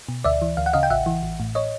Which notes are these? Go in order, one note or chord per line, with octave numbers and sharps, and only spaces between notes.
B2
D2 D5 E5
E3
D2 F5
F#5
C#3 D#5 F5
G5
A1 E5 F#5
E3
A1
A2
C#5 D#5